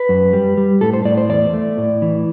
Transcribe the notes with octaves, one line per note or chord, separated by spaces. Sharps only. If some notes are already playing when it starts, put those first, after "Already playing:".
Already playing: B4
F#2
G3
G3
A2 A4
C5
A2 D5
C5
E2 D5
A3
A2
E3